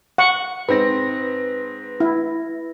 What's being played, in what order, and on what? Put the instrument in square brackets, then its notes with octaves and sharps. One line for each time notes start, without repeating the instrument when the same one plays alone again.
[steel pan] F#5 C#6
[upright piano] G#2 C4 [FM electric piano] B4 A#6
[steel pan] E4